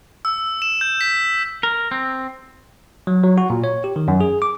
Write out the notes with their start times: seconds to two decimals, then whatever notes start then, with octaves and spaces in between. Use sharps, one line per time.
0.25 E6
0.62 E7
0.81 G6
1.01 B6
1.63 A#4
1.91 C4
3.07 F#3
3.24 F#3
3.38 F#4
3.50 A#2
3.64 C#5
3.84 G4
3.96 D#3
4.08 F#2
4.20 G#4
4.42 D6